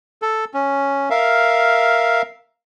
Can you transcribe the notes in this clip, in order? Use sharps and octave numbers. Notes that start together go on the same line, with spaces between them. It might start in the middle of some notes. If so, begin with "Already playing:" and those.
A4
C#4
A#4 E5 F5